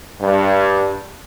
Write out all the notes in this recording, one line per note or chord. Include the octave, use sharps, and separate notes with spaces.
G2